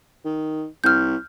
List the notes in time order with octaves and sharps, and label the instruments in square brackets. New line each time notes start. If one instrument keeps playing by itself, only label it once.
[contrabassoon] D#3
[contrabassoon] C2 [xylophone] F6 G6